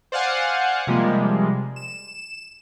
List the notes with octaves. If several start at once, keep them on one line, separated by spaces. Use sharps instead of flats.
C5 D5 F5 F#5 G#5
C3 F3 G3 G#3 A#3
E7